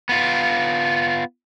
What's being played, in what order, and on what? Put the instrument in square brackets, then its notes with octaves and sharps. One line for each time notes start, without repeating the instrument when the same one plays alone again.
[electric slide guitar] B3 F4